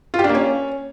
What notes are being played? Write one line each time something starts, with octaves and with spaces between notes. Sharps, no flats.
F4
G4
D4
A#3
C#4